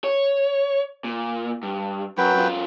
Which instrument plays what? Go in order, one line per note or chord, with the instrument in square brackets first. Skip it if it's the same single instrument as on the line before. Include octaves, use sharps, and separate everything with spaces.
[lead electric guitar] C#5
A#2
G2
[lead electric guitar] F#2 [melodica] F#3 B4 G5
[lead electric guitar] F#2 F4